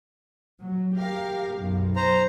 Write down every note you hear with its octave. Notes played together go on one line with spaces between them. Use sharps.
F#3
G4 A#4 F5
B1 F#2
C5 A#5